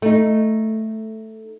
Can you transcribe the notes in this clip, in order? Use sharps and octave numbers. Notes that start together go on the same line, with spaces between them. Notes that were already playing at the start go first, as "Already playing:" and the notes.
A3 D#4